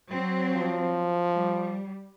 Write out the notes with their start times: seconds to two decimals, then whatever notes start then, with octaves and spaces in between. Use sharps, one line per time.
0.11 F#3 C4
0.53 F3
1.33 G3